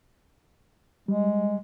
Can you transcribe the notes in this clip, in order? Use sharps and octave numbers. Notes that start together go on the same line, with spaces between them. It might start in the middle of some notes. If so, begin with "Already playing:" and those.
G3 G#3